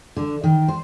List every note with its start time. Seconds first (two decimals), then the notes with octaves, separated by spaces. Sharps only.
0.17 D3
0.44 D#3
0.68 C5